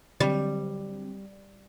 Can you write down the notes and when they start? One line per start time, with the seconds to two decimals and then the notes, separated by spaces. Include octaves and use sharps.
0.20 D3 F#3 G3 C4